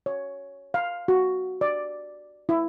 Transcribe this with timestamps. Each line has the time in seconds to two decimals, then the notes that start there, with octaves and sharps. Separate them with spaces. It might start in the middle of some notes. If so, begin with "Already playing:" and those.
0.06 C#5
0.74 F5
1.08 F#4
1.61 D5
2.49 E4